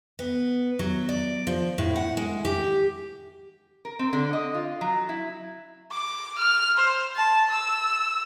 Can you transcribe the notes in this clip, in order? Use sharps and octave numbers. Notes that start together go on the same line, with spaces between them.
B3
F#3
D5
F3
A2
F#5
G#3
G4
A#4
C4
D3
D#5
F4
F#3
E4
D6
F6
C5
A5
E6